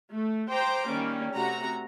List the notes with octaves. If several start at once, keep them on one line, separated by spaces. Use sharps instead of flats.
A3
C5 G5 A#5 C6 D6
D#3 G3 A#3 C#4
C3 A3 F#4 A#5